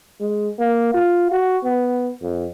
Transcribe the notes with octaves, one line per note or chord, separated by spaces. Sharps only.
G#3
A#3
F4
F#4
B3
F2